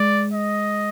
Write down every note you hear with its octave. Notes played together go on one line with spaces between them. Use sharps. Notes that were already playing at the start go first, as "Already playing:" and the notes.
Already playing: G#3 D5
D#5